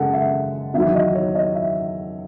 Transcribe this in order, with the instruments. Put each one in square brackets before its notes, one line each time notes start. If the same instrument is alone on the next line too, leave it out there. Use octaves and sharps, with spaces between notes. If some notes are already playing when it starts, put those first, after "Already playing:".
Already playing: [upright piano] F#2 C#3 G#3 G#4 A4 F#5
E5
E2 D#3 F#3 E5
D#5
C#5
D#5
E5